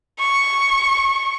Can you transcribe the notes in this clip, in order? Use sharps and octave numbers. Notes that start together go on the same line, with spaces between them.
C#6